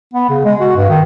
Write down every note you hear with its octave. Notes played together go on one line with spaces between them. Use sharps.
B3
C#3
G#3
F#4
G2
D#3